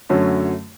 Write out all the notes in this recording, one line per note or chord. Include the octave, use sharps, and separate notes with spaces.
F#2 D3 F#3 A3 C#4